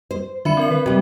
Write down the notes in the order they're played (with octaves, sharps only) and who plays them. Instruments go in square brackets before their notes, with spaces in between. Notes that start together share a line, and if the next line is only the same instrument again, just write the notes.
[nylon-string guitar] C5
[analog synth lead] D3 [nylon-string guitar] F4 [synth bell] E5 B5 C#7
[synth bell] C4 A#4 F#7
[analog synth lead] B4
[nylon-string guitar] C3 G3 [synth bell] F#4